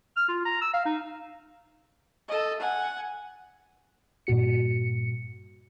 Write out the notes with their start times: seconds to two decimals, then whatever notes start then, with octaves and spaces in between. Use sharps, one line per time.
0.17 F6
0.29 F4
0.45 A#5
0.62 E6
0.74 F5
0.86 D#4
2.28 A4 D#5
2.60 F#5 G#5
4.27 G2 A#2 F#4 C#7